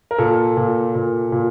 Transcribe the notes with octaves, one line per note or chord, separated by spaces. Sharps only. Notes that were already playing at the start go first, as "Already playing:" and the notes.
A#4
A#2 A4
A#2
A#2
A#2